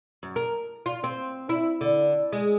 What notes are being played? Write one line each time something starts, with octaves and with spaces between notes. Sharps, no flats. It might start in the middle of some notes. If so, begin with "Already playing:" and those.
F#2
A#4
F4
C4
E4
D3
G#3